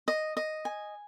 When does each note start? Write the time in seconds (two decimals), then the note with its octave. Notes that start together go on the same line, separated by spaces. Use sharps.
0.08 D#5
0.37 D#5
0.65 G#5